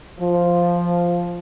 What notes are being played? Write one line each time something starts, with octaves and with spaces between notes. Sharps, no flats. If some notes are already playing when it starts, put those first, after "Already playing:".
F3